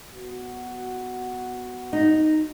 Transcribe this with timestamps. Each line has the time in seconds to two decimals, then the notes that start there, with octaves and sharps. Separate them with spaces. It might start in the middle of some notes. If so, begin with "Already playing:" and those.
0.13 B3 F#4
1.93 D#4